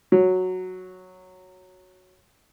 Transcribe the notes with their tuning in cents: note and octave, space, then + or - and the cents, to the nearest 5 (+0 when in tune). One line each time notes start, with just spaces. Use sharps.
F#3 -5